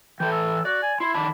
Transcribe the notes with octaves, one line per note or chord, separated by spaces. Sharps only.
E3 A4 G5
E6
F#4 D5
G#5
E4 C6
D#3 D5 A5 B5